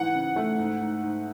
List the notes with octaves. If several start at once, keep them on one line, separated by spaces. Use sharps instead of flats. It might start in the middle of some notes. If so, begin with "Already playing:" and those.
Already playing: G#2 E3 F#5
C#3
A3
G#2
G#2
G#2